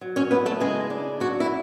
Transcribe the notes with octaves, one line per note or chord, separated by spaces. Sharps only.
F#3
C#4 C#5
B3 E4 B4
A3 A4
C#3 G#3 G#4
D4
F#3 F#4
E4